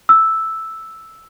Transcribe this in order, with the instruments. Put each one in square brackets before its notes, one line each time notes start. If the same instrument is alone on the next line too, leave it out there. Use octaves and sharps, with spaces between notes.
[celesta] E6